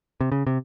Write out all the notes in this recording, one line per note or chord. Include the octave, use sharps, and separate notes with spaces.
C3
C#3
C3